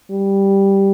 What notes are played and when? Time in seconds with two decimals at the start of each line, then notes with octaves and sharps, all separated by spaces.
0.11 G3